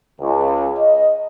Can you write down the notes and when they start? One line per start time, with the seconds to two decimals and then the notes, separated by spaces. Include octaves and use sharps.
0.20 C#2
0.78 D#5